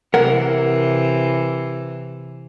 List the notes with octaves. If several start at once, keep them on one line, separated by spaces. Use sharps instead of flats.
C3 E3 A#4 F#5